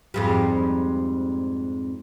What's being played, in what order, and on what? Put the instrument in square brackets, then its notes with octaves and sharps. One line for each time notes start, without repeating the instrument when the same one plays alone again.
[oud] F2 G#2 G3